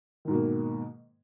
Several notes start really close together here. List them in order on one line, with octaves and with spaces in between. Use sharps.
D#3 G#2 B2 A#3